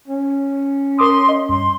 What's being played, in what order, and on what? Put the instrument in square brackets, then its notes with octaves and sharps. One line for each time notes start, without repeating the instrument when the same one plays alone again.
[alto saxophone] C#4
[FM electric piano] A#4 D6 D#6 [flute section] C6
[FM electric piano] D#5
[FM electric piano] G2 [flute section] C6